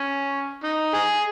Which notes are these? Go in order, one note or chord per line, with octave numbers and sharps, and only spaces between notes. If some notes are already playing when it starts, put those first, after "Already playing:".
Already playing: C#4
D#4
D#4 G#4